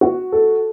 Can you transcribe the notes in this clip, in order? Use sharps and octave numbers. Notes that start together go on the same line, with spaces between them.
F#4
A4